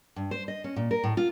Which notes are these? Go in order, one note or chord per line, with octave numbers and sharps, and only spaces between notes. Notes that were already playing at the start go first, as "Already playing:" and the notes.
G2
C5
D#5
C#4
A#2
A#4
A2
F4